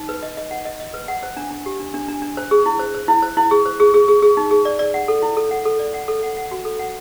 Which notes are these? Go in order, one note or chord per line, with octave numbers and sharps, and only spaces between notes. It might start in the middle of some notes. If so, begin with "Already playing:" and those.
Already playing: D#4
B4
D#5
D#5
F#5
D#5
D#5
B4
F#5
C5
D4
D4
G4
D4
D4
D4
D4
C5
G#4
E4
C5
C5
E4
C5
E4
G#4
C5
G#4
G#4
G#4
G#4
D#4
G#4
D5
D5
F#5
A4
E4
A4
F#5
A4
D5
F#5
A4
F#5
F#5
F#4
A4
F#5